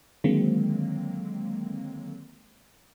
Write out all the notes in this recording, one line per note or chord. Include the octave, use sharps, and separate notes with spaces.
D3 D#3 F#3 G#3 A#3 C4